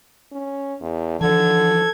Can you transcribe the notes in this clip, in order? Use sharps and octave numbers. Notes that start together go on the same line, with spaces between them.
C#4
E2
D3 E3 F3 A4 G#6